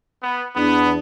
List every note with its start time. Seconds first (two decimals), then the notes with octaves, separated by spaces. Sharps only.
0.23 B3
0.56 E2 B3 D4